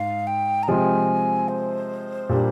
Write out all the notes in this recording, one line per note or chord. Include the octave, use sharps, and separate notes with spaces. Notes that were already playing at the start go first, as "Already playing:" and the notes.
Already playing: G#2 F5
G5
A#5
C3 F3 G#3 C4 G#5
C5
A#2 G3 D4